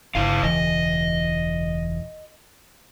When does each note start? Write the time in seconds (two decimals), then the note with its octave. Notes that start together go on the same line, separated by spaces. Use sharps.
0.15 G1 C#3 E4 F5
0.43 E1 C#2 E3 D#5